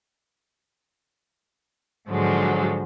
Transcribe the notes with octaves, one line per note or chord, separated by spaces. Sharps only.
G#2 D3 F3 F#3 G#3